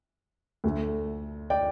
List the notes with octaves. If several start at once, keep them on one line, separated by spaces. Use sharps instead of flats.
D2 D3 A3
D5 G5